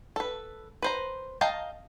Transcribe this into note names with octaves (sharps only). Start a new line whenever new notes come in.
A4 B4
B4 C5 A#5
D#5 F5 G5 A5 A#5